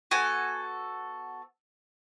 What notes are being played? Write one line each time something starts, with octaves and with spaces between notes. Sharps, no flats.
B3 F#4 A4 G#5